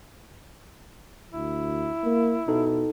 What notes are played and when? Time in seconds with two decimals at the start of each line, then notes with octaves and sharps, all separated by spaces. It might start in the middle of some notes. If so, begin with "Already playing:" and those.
1.33 D2 E4
2.04 A#3
2.48 B2 D#4 A4